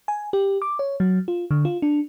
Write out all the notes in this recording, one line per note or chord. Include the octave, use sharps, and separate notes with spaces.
G#5
G4
D6
C#5
F#3
F4
D3
F4
D4